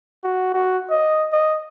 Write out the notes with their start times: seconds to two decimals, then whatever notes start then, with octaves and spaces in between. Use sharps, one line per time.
0.24 F#4
0.54 F#4
0.90 D#5
1.32 D#5